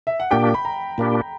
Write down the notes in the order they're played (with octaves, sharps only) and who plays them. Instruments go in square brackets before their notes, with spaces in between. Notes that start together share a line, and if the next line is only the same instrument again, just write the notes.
[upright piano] E5
F#5
[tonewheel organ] A#2 A#3 D4 G4 [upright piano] G5
[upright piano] B5
A#5
[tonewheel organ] A#2 A#3 D4 G4